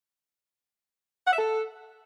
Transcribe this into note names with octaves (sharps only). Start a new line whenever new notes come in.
F#5
E5
A4